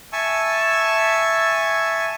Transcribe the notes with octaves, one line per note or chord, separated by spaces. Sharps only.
E5 G#5 A5 C#6 E6